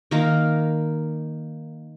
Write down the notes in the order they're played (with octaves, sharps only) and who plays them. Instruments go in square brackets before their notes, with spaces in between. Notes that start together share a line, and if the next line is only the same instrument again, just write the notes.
[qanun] D#3 A#3 A#4